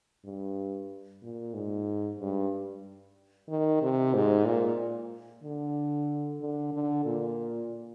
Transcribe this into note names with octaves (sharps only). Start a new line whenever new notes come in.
G2
A#2
G#2
G2
D#3
C3
G#2
A#2
D3
D3
D3
A#2